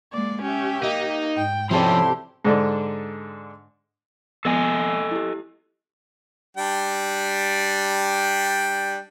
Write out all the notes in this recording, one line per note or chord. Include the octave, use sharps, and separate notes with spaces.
G#3 A#3 D5
C#4 G4 E5
A#3 D#4
G#2 G5
C3 F3 C#4 E4 G4 A4 D5 C6
G#2 D3 D4
F3 G#3 B3 A4 D#5 G#5
E4 G4
G3 D4 G5